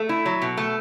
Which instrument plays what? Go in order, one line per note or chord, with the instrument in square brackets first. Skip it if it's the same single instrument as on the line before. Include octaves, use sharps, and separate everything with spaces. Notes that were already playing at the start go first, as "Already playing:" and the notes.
Already playing: [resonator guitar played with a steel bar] A3 [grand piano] A4
[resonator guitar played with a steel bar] E4
F#3
B2
A3